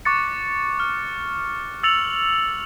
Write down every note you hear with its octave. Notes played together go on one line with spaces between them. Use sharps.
C#6 D6 F#6 A6 C#7
F6
E6 A6 C#7 F7 F#7